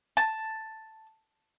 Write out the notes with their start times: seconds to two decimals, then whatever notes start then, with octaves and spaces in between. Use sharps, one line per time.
0.17 A5